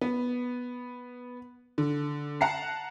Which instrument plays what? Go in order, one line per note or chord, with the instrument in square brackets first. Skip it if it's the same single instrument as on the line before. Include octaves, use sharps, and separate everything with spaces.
[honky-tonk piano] B3
D3
F#5 A5 A#5 C7